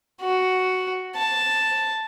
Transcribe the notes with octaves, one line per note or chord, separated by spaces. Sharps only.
F#4
A5